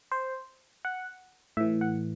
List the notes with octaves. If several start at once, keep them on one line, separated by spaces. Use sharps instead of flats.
C5
F#5
A2 E3 E5
F#5